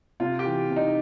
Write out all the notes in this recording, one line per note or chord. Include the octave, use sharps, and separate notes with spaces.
C3 F4
G4
E3
C3
D#4